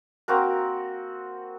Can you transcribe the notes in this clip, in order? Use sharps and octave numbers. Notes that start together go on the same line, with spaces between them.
A#3 C4 F#4 A#4